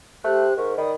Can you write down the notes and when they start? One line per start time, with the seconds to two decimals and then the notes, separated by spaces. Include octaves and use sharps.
0.24 A3 G4 C5 F#6
0.57 G#2 A#4 C#6
0.78 D#3 D5 B5 D#6